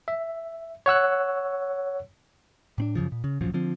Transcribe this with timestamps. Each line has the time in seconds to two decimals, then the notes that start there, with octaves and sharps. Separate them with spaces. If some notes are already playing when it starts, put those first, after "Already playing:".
0.08 E5
0.86 C#5 F#5 E6 F#6
2.78 A2 C4 D4
2.95 F#2 A2 C#3 F3
3.12 A#2
3.24 C#3
3.41 D1 A#1 F#2 F3
3.54 D3 F3 C4